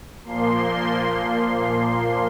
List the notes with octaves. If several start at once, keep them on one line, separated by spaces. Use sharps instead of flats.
A#2 F3 A#3 C6